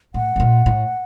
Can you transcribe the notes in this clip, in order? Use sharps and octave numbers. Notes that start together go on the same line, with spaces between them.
A2 F#5
A2
A#2
A2